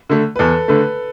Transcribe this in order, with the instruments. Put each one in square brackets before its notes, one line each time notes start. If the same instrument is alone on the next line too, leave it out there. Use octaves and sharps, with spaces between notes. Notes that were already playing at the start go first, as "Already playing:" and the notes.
[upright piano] D3 A3
[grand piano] B4
[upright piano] E2 [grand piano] A4
[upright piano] D3 A3 [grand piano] B4